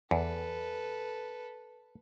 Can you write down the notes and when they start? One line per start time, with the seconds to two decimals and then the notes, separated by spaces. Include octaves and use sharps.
0.11 E2 A4 B4